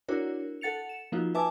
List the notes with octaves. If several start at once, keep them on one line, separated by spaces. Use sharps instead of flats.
D4 E4 F#4 A#4 C#5
A4 F#5 A6 C#7 F7
E7
F3 A#3 D#4 F4 F#4
B4 E5 G#5 A5 D6